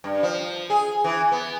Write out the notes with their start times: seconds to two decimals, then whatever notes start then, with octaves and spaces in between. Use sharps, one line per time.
0.04 G2
0.23 F3
0.70 G#4
1.04 E3
1.32 B3